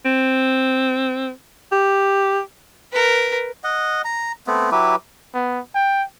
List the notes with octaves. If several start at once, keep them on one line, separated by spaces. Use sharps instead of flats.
C4
G4
A#4 B4
D#5 F#5
A#5
A3 B3 C4
F#3 E4 G4 B4
B3
G5